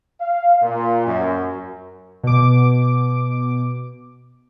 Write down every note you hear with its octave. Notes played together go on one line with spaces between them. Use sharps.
F5
A#2
F#2
B2 D6